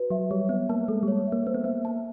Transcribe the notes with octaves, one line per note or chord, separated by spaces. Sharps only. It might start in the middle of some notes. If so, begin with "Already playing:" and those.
Already playing: F#4 B4
F#3 E5
G3 C#5
B3 E5
A#3 A5
G#3 A4
G3 C#5
E5
A#3
A#3 C5
B3
A#3 E5
A5